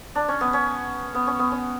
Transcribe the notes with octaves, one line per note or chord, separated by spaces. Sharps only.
D4
C#4
B3
C#4
B3
C#4
B3
C#4